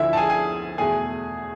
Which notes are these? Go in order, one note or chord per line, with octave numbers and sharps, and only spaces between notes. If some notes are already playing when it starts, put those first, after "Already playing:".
Already playing: D2 D3 F3 E4 E5
A5
G#4 G#5
G#4 G#5
E2 B2 A3 G#4 G#5